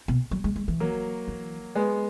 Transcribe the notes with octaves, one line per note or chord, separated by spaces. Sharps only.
B2
F#3
G#3
G#3
E3
F#3 A#3
E3
G#3 B3